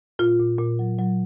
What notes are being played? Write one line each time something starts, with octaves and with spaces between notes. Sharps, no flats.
A#2 F4
A#2
A#2
F#3
F#3